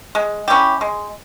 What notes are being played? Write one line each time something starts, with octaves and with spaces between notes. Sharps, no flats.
G#3
C#4 E4 G4
G#3